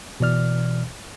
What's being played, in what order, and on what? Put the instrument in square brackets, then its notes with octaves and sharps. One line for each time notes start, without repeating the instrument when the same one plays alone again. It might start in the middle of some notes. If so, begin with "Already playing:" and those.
[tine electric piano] B2 E3 D5 F6